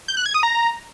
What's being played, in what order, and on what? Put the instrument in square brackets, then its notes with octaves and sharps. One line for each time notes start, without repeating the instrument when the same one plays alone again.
[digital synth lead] G6
F#6
G#6
D#6
A#5